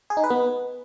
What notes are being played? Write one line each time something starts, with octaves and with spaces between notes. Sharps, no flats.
G#4
D#4
B4
B3